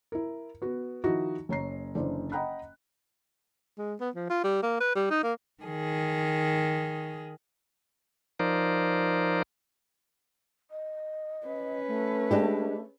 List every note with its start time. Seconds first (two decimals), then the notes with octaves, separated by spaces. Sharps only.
0.12 E4 A#4
0.62 B3 F#4
1.04 D#3 F3 D#4 E4 F#4
1.49 F#1 C#5 A#5 C7
1.95 F#1 D3 E3 C5 D5
2.32 D#5 F#5 G5 A#5 B5 F#6
3.78 G#3
4.00 B3
4.15 F3
4.29 F4
4.44 G3
4.63 A#3
4.80 B4
4.95 G3
5.10 D#4
5.23 A#3
5.62 D#3 G#4
8.39 F3 D#4 A#4 C5 D5
10.71 D#5
11.47 C#4 B4
11.87 A3
12.31 G#3 D4 G4